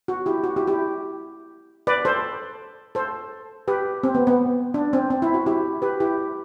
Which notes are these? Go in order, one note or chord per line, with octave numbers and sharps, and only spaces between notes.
F#4
E4 G4
F#4
E4 G4
E4 G4
B4 D5
A4 C5
A4 C5
G4 B4
C4
B3
B3
D4
C4
C4
E4
F#4
E4 G4
G4 B4
E4 G4